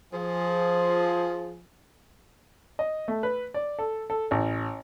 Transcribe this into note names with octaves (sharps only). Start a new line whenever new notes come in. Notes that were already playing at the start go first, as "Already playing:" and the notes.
F3 G#4
D#5
A3
B4
D5
A4
A4
A1